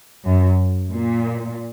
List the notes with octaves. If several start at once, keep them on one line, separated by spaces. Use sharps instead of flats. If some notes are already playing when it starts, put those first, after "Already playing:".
F#2
A#2